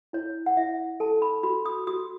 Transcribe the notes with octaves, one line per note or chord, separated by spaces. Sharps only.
E4 C#5
F#5
E4 E5
A4 A5
B5
F#4 B5
D#6
F#4 D#6